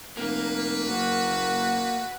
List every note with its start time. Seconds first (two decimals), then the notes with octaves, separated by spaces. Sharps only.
0.17 F1 A#3 B4
0.88 F#1 F#4